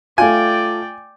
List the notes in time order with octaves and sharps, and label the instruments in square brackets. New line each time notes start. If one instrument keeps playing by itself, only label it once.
[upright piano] A3 F4 [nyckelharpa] D5 G5 [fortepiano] G#5